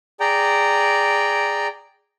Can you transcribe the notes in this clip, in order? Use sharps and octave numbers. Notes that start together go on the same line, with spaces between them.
G#4 D5 G5 A#5